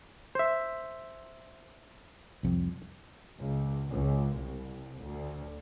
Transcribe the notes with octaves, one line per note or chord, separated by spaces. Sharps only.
C5 E5
C2 F2
C#2
C#2
C2
D2